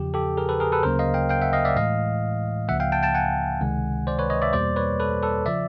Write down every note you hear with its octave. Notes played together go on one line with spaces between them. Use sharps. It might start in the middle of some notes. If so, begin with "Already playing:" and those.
Already playing: E2 C#3 F3 G4
G4 A4
G#4 A#4
A4 B4
G#4 A#4
A4 B4
D2 C#3 F#3 A#3 A#4 C5
D#5 F5
F5 G5
F5 G5
E5 F#5
D#5 F5
D5 E5
A2 E3 G#3 D#5 F5
C#2 C#3 F3 A#3 E5 F#5
F5 G5
G5 A5
G5 A5
F#5 G#5
C#2 C3 D#3 G#3
C5 D5
B4 C#5
C#5 D#5
D5 E5
E2 B2 G3 A#3 C5 D5
B4 C#5
A4 B4
A4 B4
C#3 F3 D5 E5